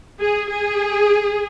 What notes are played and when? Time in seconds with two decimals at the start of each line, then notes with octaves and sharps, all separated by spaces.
0.21 G#4
0.50 G#4